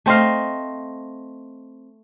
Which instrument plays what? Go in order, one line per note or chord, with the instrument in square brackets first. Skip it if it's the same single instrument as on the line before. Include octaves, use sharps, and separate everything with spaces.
[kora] A3 C4 D#5 F5